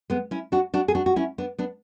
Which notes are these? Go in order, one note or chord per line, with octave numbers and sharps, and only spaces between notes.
G#3 B3
C#4 E4
D4 F#4
D4 F#4
G#4
D4 F#4
F#4
C#4 E4
B3 D4
B3 D4